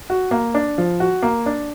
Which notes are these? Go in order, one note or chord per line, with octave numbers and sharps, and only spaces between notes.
F#4
A#3
D4
F3
F#4
A#3
D4